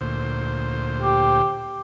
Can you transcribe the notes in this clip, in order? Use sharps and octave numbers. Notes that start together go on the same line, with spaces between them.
D2 A#2 C5
G4